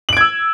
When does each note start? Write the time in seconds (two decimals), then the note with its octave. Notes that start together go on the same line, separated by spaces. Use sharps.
0.09 F#7
0.13 D7
0.17 G#6
0.21 E6